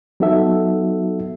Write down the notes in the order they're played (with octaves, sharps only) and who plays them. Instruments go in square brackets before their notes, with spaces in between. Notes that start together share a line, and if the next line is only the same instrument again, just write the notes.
[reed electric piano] F#3 B3 D#4 F#4 A4 E5